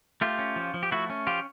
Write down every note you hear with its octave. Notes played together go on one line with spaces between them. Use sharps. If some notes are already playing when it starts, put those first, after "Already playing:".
A3 F4 G4
C#4
F3
F3
G4
A3 E4 F#4
C#4
F3 F4 G4